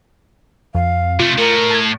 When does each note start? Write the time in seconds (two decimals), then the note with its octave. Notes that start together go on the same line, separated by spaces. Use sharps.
0.75 F2 F5
1.20 C3 A3 F4
1.38 A2 A#4
1.70 A5 G#6